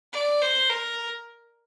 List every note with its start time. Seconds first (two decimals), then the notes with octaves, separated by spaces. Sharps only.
0.13 D5
0.42 C5
0.70 A#4